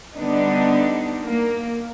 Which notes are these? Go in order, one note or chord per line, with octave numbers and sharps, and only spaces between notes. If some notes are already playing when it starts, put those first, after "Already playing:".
D3 G3 B3 D4 D#4
A#3